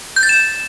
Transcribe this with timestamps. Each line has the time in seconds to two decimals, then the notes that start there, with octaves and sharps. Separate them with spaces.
0.16 G6
0.23 A6
0.29 E7